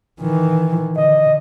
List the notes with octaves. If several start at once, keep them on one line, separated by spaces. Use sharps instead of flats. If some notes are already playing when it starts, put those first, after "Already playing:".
D#3 E3
D3 D#5